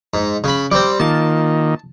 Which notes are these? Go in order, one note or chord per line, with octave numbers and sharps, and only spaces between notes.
G#2
C#3 B5
G3 C4 D5
D#3 A#3 F4 A5